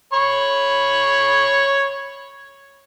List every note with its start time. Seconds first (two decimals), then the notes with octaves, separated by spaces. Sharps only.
0.13 C#5 B5 C#6